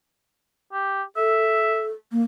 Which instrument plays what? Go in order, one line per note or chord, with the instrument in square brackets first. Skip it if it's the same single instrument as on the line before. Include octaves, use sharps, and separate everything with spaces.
[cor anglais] G4
[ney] A4 [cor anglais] E5
[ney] A#3